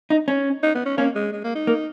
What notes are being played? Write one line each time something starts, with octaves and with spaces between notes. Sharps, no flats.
D#4
C#4
D#4
B3
C#4
A#3 C#4
G#3
G#3
A#3
D#4
A#3